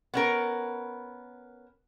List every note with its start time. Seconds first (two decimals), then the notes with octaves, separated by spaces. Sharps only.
0.14 B3 C#4 A#4